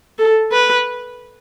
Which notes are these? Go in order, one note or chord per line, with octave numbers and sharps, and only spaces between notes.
A4
B4